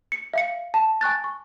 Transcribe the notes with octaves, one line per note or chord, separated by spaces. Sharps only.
C#7
E5 F5 C#7
A5
G#5 C#6 F#6 A6
C#6